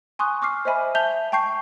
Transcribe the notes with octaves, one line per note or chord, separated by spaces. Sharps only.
G#5 C6 C#6 D#6 F#6
C#6 D6 F6 C7
C5 D#5 E5 G#5 B5
E5 A5 G6 F7 G7
G5 A5 C#6 G6 C7